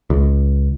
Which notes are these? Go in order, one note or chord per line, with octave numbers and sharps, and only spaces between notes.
C#2